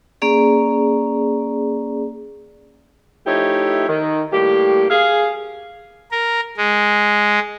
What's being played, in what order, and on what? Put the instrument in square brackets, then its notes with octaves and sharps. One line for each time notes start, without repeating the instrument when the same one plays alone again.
[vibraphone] A#3 C#4 G#4 D5
[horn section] F3 A3 D#4 E4 G4 C#5
D#3
A2 G3 A#3 G4
G#4 F5
[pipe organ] A#4
G#3